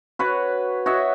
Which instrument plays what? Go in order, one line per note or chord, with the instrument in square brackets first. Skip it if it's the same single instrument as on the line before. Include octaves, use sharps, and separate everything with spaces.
[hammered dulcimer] F#4 B4 C#5 F#5
F#4 C#5 D#5 E5